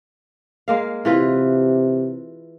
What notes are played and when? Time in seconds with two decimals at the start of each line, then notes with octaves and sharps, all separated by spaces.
0.68 G#3 A#3 F5
1.05 C3 E3 F4 B4